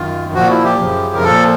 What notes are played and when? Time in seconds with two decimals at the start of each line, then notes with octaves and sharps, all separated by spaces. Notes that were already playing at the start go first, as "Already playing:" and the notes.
Already playing: F#2 D#3 F4
0.34 A#2 F3 F#4
0.50 E4
0.64 G4
0.79 F#2 C#3 F3
1.15 A#4
1.24 A#2 F3 A4